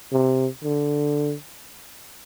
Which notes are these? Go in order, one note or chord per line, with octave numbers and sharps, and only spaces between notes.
C3
D3